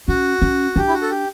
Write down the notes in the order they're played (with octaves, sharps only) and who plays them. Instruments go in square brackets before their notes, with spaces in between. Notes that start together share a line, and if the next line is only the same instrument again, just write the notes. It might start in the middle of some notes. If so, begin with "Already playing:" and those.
[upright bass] C#4 [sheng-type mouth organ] F#4
[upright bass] C#4
[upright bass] D4 [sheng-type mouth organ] G4
[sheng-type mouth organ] E4
F#4
A4
G4